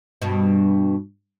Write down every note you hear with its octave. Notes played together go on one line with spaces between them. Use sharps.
G2 B2